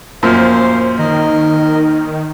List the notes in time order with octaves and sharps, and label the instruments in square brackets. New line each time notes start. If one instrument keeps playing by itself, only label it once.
[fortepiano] F#2 A#2 F3 [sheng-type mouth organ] C5 F5
[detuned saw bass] D#3 [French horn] D#4 [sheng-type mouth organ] A#4 D#5